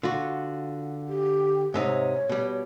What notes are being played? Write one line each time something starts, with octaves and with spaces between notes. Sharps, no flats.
D3 F4 F#4
G4
G#2 C3 D#4 C#5
B2 G3